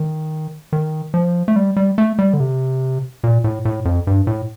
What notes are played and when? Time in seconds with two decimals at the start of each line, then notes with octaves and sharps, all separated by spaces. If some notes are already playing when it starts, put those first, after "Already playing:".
Already playing: D#3
0.73 D#3
1.14 F3
1.48 A3
1.56 G3
1.76 G3
1.98 A3
2.19 G3
2.34 D3
2.40 C3
3.24 A#2
3.44 A2
3.65 A2
3.85 F2
4.07 G2
4.27 A2